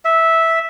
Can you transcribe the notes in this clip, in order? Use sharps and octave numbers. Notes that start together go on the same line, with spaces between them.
E5